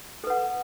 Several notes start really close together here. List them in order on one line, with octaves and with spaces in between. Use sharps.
A4 B4 F#5